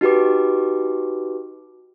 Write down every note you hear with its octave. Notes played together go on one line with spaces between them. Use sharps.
D#4 F#4 G4 B4 D6